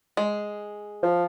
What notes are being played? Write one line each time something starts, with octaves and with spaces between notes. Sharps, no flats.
G#3
F3